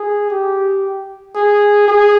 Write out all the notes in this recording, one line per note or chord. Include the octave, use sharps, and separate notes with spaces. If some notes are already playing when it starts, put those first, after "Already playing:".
Already playing: G#4
G4
G#4
G#4